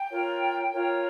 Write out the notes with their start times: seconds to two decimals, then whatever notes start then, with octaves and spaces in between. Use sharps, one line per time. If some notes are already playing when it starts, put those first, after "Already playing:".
Already playing: G5
0.10 F4 A#4 C#5
0.72 F4 A#4 C#5